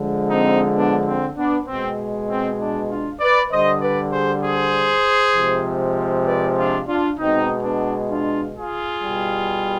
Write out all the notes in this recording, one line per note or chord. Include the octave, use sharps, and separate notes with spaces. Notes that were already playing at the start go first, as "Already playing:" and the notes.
Already playing: D3 F3 G#3
C4 D#4
B3 D4
C4
B3 D4
B2 G#3 C4
C4
B3 D4
D4 F4
B4 D5
D3 G3 C5 D#5
B4 D5
G#4 C5
G#4 C5
C3 F3 G#3
B4 D5
D4 F4
D4 F4
B2 G#3 C4 D#4
B3 D4
D4 F4
F4 G#4
B2 G3